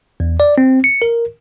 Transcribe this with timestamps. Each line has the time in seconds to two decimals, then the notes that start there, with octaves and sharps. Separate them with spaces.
0.20 E2
0.40 D5
0.58 C4
0.84 C#7
1.02 A#4